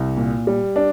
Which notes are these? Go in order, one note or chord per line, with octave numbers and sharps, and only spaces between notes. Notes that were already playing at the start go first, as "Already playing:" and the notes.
Already playing: C2
A#2
G3
D4